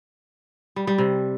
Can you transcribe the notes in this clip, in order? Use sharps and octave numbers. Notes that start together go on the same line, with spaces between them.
G3
G3
C3